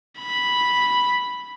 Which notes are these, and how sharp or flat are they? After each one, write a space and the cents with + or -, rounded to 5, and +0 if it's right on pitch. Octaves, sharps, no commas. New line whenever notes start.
B5 -5